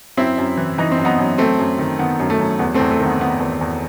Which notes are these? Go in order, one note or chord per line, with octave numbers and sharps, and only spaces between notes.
F#2 C4 E4
F#2
E3
E3 D#4
C4
F#2
B3 D#4
F#2
F#2 A3 C4
F#2
D#3
D#3 B3
F#2
A3
F#2
E2 B3
A3 C4
E2
A3
D#3
B3
D#3 B3
E2
E2